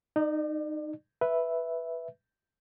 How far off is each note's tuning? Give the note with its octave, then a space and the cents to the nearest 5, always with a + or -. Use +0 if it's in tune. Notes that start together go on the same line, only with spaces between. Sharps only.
D#4 -15 D5 +35
B4 +0 E5 +0